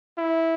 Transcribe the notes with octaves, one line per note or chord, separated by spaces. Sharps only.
E4